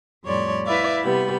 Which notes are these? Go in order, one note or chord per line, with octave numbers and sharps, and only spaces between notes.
F2 A2 G3 C#5 D5 C6
E4 B4 D5 E5 F5
C3 G3 B3 B5